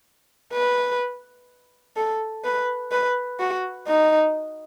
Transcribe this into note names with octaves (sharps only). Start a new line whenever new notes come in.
B4
A4
B4
B4
F#4
D#4